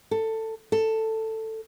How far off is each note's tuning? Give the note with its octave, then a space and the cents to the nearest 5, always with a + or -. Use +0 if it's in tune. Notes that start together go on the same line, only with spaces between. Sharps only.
A4 +15
A4 +10